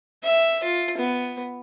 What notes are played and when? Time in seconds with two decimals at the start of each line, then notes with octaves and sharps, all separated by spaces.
0.24 E5
0.64 F4
0.98 B3